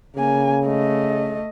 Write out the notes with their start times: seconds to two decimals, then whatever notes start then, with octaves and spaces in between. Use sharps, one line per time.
0.16 C#3 A#3 G#5
0.66 A3 D#5